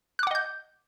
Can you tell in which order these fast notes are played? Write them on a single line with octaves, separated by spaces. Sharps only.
F#6 D6 F#5 D#5 G6